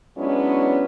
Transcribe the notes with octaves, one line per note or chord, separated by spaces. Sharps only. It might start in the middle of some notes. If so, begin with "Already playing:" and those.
F#3 G#3 B3 C#4 D4 E4